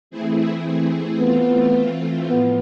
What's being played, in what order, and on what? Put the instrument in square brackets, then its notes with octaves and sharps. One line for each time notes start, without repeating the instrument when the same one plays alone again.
[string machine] E3 A3 C4 E4 G#4
[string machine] E3 A3 C4 F4 [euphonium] B3
[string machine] A2 F3 [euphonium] B3